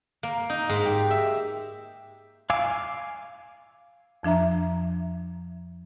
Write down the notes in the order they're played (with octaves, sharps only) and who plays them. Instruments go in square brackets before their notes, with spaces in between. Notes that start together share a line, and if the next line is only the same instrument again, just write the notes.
[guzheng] A#3
D#4
G#2
G4
E5
[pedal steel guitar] F5 G#5 D6 E6
[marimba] F2 F3 D4 E5 A#5